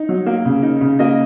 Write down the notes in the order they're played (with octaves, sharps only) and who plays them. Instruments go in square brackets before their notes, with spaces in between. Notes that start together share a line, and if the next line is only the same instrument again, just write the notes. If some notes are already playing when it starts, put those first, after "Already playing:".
Already playing: [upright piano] D#4
F#3
A#3
C#3
D#4
C#3
A#3 D#5